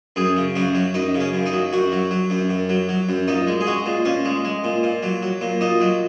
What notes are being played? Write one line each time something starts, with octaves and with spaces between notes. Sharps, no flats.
F#2 G#4
C#3
F#2 F#4
F#3
F#2 D#4
C#3
C#4
F#2
D#4
F#3
F#2 F#4
F#3
F#3
F#2
F#2
F#3
F#3
F#2
A#2 D#4
G#3
G#4
G#3 F#4
A#2
A#2 C#4
G#3
G#3
A#2
A#2
F#3
F#3
A#2
A#2 D#4
F#3